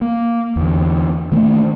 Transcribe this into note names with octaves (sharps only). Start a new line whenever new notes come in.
A#3
E2 D3
D#3 A3 A#3